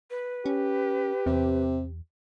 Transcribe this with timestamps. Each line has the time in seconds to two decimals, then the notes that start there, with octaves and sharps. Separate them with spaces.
0.10 B4
0.46 C#4 G4
1.26 E2 C3